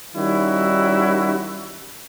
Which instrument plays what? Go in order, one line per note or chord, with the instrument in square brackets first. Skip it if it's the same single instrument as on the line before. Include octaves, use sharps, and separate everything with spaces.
[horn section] D#3 G3 C#4 D#4 E4 F#4